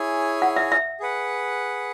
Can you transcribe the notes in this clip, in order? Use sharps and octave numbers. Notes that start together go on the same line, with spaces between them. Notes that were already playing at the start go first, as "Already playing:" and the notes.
Already playing: E4 G#4 C#5 G#5
F#5
E5
E5
G#4 B4 F#5